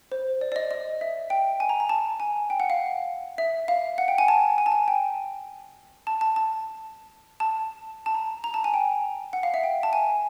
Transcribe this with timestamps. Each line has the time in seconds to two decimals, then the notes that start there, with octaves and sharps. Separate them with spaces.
0.12 C5
0.41 D5
0.52 D5
0.56 D#5
0.71 D#5
1.01 E5
1.30 G5
1.60 G#5
1.69 A#5
1.80 A#5
1.89 A5
2.20 G#5
2.50 G5
2.60 F#5
2.70 F5
3.38 E5
3.68 F5
3.98 F#5
4.08 G5
4.18 G#5
4.28 A5
4.58 G#5
4.66 A5
4.72 G#5
4.88 G5
6.07 A5
6.21 A5
6.36 A5
7.40 A5
8.06 A5
8.14 A#5
8.44 A#5
8.54 A5
8.64 G#5
8.74 G5
9.33 F#5
9.43 F5
9.54 E5
9.63 G5
9.83 A5
9.93 G#5